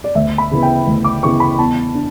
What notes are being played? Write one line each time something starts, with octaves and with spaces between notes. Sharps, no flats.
D5
D2 E5
B5
C#3 E3 B3
G5
D2
D6
C#3 E3 B3 C#6
B5
E2 A5
D4